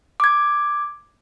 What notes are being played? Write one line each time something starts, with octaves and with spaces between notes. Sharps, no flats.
D6 G#6